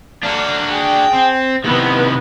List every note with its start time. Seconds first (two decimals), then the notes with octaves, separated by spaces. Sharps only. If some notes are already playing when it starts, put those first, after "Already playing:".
0.23 F#3 A3 A#3 D4 F#4
0.70 G#4 G5
1.14 C4
1.64 C3 D#3 B3 E4